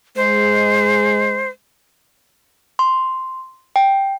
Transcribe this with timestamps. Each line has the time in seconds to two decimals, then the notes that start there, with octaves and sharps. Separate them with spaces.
0.16 G#3 C5
2.79 C6
3.76 G5